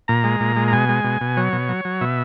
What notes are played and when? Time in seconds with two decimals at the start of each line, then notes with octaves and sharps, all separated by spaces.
0.08 A#2 A#5
0.24 G#3
0.40 A#2
0.56 G#3
0.68 A#5
0.73 B2 G#5
0.89 G#3
1.04 B2
1.21 B2
1.37 F#3 C#5
1.53 B2
1.69 F#3
1.85 F#3
2.01 B2 E5